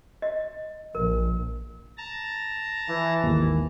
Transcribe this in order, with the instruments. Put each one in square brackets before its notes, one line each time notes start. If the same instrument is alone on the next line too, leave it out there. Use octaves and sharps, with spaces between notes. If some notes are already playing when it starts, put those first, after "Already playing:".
[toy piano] D#5
[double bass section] A#1 [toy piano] A#4
[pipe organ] A5 A#5
[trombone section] E3
[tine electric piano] G#1 D#2